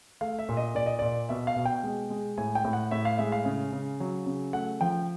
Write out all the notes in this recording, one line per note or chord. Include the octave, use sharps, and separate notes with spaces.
A3 F5
E5
A#2
D#5
A#2 D5
D#5
A#2 D5
B2 E5
F5
B2
G5
G#3
G#3
A2 G#5
G5
A2
F#5
A2 E5
F5
G#3 E5
F5
C#3
C#3
F#3
C#3
A3 F#5
F3 G5